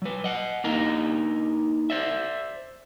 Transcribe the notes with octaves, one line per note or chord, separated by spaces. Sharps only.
F#3 B4
D#5 F#5
A#3 D4 D#4 A#4 D#5 A#5
C5 D5 E5